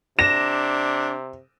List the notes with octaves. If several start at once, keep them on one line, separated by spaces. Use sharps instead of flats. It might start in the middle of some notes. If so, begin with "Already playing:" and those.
C3 D4 A#6 E7